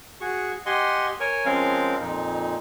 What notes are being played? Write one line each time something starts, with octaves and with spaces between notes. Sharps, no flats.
F#4 G#4 C#6
G4 D#5 F#5 G#5 C6
A#4 C#5 G#5
F3 G#3 C4 C#4 A#4 F5
F2 A#2 D#4